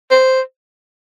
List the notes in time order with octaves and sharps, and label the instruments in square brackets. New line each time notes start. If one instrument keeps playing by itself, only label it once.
[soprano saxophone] C5